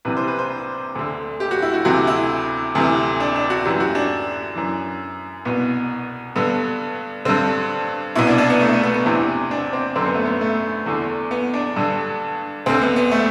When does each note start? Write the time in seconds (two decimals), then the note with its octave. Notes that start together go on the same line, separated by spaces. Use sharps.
0.05 C2 C3 E3 B4
0.17 C5
0.28 B4
0.39 C5
0.95 D2 D3
1.40 G4
1.51 F#4
1.62 E4
1.74 F#4
1.85 D2 C3 E3 F#4
2.07 E4
2.75 D2 C3 E3
3.20 D4
3.36 D4
3.50 F#4
3.65 F#2 E3 G4
3.80 F#4
3.95 D4
4.56 F#2 E3
5.45 C2 B2 B3
6.36 G2 D3 B3
7.25 G2 D3 C4
8.15 C2 B2 E4
8.27 D4
8.38 D4
8.50 B3
8.60 A3
8.72 A3
8.83 B3
8.95 B3
9.06 E2 C3 E3 C4
9.51 D4
9.73 C4
9.96 F#2 D3 C4
10.06 B3
10.15 A3
10.25 B3
10.41 A3
10.86 E2 D3
11.31 B3
11.54 D4
11.76 G2 D3
12.66 D2 D3 C4
12.82 B3
12.96 B3
13.11 A3